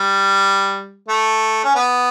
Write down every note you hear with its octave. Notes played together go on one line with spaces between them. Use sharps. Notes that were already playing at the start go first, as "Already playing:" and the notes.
Already playing: G3
A3
C#4
B3